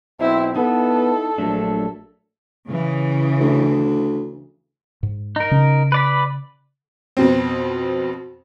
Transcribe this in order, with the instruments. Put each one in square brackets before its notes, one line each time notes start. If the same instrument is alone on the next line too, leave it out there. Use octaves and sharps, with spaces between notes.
[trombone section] B1 C4 [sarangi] E4
[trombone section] B3 [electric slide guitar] D#4 E4 [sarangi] A4
[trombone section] A#1 [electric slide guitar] F#3 A3 D4
[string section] C#3 E3
[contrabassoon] D2
[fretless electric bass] G#2
[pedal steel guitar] D#4 A#4
[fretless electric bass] C#3 C#4
[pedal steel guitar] B4 D5 B5
[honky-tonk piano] F2 B2 C4